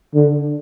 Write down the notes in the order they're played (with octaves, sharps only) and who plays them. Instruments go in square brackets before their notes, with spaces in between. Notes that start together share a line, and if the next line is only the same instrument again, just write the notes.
[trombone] D3